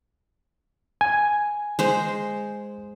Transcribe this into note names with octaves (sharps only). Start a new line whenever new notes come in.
G#5
G#3 C5